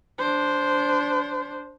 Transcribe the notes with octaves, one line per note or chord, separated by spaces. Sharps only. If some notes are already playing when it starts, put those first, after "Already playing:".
D4 C5